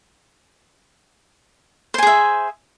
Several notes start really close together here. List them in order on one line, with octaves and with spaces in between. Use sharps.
C5 G#5 G#4 E5